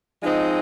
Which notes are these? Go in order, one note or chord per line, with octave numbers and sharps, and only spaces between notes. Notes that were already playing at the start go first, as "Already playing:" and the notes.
F3 G#3 C4 D#4